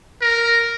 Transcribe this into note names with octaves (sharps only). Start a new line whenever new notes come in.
A#4